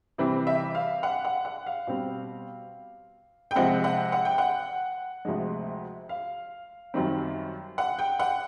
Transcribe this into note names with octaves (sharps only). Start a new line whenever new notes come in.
C3 E3 G3 C4
E5
F5
F#5
F#5
F#5
F5
B2 G3 C4
G5
C3 F3 G#3 C4 F#5
F#5
F#5
G5
F#5
D2 C3 F3 G#3
F5
F#2 D#3 G3 C4
F#5
G5
F#5